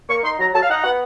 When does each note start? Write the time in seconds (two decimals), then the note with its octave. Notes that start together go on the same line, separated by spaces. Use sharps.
0.09 A#3 C#6
0.23 D#4 C6
0.39 F#3 A#5
0.54 F#3 A5
0.63 F5
0.70 D#4 F#5
0.84 B3 F#5